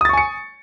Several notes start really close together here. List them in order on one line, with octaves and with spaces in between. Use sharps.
D#6 A6 C#6 G#5 C#7